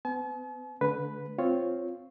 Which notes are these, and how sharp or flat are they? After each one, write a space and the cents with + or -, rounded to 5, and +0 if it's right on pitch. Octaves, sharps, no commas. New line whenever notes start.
B3 +40 A5 -45
D3 -25 G#3 +40 B4 +0
C4 +0 F4 +0 C#5 +0